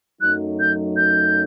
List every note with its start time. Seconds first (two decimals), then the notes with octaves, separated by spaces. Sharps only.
0.21 F#2 F#3 A3 D#4 F#6
0.60 G6
0.96 G6